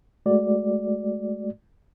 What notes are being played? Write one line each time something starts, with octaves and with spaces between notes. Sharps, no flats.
G#3 A3 F#4 D5